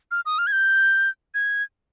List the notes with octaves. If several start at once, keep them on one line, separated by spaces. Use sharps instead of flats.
F6
D#6
F6
G#6
G6
G#6